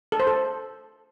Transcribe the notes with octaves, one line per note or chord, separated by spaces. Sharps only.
A4
C5
A4